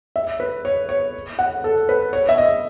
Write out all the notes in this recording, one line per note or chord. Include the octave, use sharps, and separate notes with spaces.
E5
B4
C#5
C#5
F#5
A4
B4
C#5
E5
D#5